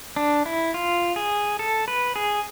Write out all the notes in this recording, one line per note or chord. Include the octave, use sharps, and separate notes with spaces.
D4
E4
F4
G#4
A4
B4
G#4